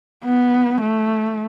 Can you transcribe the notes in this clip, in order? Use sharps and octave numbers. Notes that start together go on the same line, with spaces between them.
B3
A3